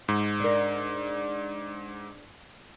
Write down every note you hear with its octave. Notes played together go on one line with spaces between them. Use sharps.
G#2
D4 A#4